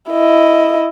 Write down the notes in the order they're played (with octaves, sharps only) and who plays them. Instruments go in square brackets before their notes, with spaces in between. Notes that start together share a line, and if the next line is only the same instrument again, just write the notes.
[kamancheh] E4 D#5